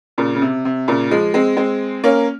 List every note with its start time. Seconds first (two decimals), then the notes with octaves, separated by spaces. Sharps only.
0.18 A#2 C#3
0.35 C#3
0.42 C3
0.65 C3
0.88 A#2 C#3
1.10 F3 G#3
1.34 G#3 C4
1.57 G#3 C4
2.04 A#3 C#4